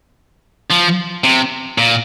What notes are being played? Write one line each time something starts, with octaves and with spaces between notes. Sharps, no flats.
F3
C3
A#2